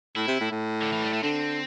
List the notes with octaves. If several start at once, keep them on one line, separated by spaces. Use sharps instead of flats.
A2 E4
C3
A2
A2
D3
E3
G3
A3
D3 C4